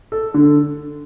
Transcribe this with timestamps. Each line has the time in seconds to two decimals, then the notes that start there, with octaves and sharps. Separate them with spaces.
0.12 A4
0.34 D3